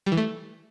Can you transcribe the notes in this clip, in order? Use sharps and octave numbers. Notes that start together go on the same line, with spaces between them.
G3
E3
A3